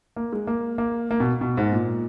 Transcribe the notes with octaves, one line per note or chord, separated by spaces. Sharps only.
A#3
G#3
A#3
A#3
A#3
B2
B2
G#2
A#2